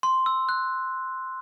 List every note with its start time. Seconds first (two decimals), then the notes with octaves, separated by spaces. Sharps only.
0.03 C6
0.26 E6
0.49 F#6